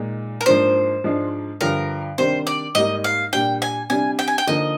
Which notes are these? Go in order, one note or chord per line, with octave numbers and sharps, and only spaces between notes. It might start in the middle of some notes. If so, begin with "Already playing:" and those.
Already playing: A#2 G#3 D#4
A#4
G#2 F3 A#3 D4 C5
G#2 F3 G#3 D4
G2 D3 F3 A#4
C3 D#3 G3 D4 C5
D5
G#2 G3 A#3 D#4 D#5
F5
A#2 G3 D4 G5
G#5
C3 G3 D4 G#5
G5
G#5
G5
D3 F3 A#3 D#4 D#5